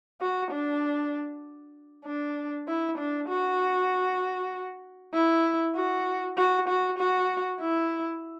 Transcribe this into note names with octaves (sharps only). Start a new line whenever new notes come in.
F#4
D4
D4
E4
D4
F#4
E4
F#4
F#4
F#4
F#4
E4